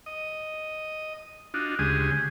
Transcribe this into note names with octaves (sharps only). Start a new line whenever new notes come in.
D#5
D4 D#4 F4 F#4
D2 C#3 G#3 G4 G#4 D#6